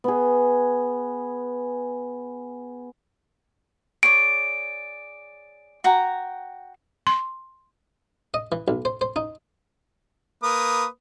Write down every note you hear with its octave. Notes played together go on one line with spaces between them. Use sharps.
B3 G#4
G#4 C#5 D5 D7
F#4 G5 A#5
C6
D#5
E3
B1
C5
C5
D#4
A#3 B4 D#6